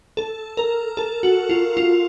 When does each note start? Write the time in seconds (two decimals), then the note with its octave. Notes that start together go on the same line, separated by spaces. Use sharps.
0.17 A4
0.57 A#4
0.97 A4
1.23 F#4
1.49 F4
1.77 F4